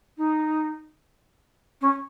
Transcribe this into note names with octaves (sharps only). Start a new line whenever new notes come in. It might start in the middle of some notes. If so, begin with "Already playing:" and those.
D#4
C#4